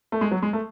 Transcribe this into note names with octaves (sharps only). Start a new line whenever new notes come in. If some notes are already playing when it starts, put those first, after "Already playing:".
A3
G#3
F#3
G#3
A3